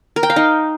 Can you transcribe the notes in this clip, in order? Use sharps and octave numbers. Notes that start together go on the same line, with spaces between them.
A#4
G5
F5
D#4